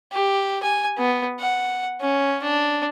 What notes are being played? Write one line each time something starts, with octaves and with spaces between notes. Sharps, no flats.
G4
G#5
B3
F#5
C#4
D4